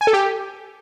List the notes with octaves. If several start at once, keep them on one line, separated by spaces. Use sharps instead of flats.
G#5
A4
G4